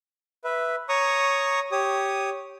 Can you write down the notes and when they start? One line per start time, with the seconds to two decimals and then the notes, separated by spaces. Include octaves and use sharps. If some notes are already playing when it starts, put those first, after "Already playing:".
0.44 B4 E5
0.89 C#5 A#5 C#6 D#6
1.72 G4 C#5 D#6